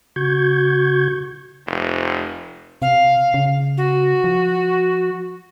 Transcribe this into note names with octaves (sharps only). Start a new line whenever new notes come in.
C#3 F#4 C#6 G6 G#6
F1
C3 F5
C#3
F#4
F3